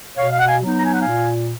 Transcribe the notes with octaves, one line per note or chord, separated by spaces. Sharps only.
B2 C#5 F5
F5
F#5
F5 G#5
F#3 B3 D#4
A#5
G#5
F#5
F5 G#5
A#2